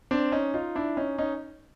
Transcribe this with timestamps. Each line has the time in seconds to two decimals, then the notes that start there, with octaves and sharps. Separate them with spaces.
0.11 C4 D4
0.32 C#4 D#4
0.54 D#4 F4
0.75 D4 E4
0.97 C#4 D#4
1.18 C#4 D#4